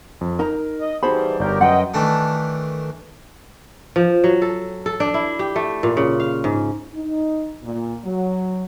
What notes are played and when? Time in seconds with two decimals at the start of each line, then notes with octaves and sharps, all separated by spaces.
0.21 F2
0.39 D#4 A#4 A#5
0.81 D#5
1.03 E3 G3 D#4 F#4 G#4 C5 A5 B5
1.39 G1 G4 A#4 D5 G6
1.61 F#2 B4 D#5 F#5 G5
1.94 D#3 E3 A3 D4
3.96 F3
4.24 F#3
4.42 A4
4.86 A4
5.00 D4
5.14 E4
5.39 G4
5.56 A3
5.83 A#2
5.97 C#3
6.20 F5
6.44 G#2
6.94 D#4
7.63 A#2
8.04 F#3